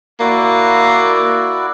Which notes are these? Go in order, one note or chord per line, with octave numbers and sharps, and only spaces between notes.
A#3 E4 F#4 D5